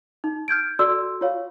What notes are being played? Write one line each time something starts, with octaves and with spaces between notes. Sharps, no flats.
D#4
F6 G6 G#6 D7
F#4 A4 D5 C6 E6
F4 C#5 F5